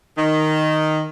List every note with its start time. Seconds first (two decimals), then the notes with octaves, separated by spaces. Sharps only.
0.17 D#3